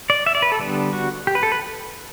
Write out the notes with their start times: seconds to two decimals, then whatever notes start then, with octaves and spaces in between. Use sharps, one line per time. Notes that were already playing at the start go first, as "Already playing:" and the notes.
0.10 D5
0.26 E5
0.35 D5
0.42 B4
0.52 A4
0.59 D3 G3 B3 D4
0.93 F#4
1.27 G4
1.35 B4
1.43 A4
1.52 B4